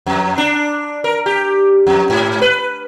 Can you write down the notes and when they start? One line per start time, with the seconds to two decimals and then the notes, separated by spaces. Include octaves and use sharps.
0.06 F2
0.38 D4
1.04 A#4
1.26 G4
1.87 F2
2.10 G#2
2.42 B4